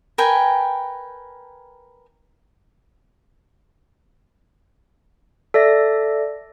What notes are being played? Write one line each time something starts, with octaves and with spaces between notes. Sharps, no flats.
A#4 B4 G5 G#5
A4 D5 E5 A#6